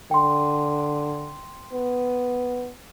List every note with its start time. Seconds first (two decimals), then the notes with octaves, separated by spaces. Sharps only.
0.11 D3 G5 C6
1.73 B3